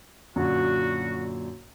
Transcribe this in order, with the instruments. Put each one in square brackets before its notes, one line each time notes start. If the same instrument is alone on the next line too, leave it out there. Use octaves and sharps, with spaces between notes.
[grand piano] F#2 A#2 D3 [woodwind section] F#4